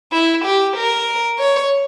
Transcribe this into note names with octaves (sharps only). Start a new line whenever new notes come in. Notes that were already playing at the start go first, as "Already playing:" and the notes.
E4
G4
A#4
C#5